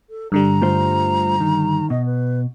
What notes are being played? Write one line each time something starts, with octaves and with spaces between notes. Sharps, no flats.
A4
G2 D3 G3 A#5
A3 F4 C5
D#3
B2 D#5
B4